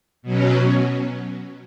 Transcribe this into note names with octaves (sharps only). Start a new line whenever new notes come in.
B2 F#3 C#4